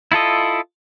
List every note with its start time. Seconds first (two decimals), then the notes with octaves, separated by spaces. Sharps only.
0.12 E4 F4 A4 D#5